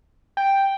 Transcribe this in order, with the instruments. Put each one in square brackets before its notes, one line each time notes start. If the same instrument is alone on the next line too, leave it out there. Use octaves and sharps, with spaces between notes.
[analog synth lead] G5